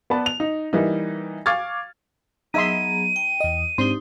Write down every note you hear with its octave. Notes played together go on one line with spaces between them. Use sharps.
B3 B4 D5 A5
F7
D#4
E3 G3 A#3 D#4
F5 C#6 D6 F6 G#6 A6
F#3 B3 D#4 G#4 E5 A#5 C6 D#7
G5
E2 D#5
G#2 C4 D4 D#4 G4 C6